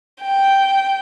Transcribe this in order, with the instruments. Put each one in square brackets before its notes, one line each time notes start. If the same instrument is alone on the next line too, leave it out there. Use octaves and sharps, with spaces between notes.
[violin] G5